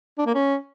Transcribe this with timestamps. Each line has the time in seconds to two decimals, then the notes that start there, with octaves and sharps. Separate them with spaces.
0.18 D4
0.26 A#3
0.35 C#4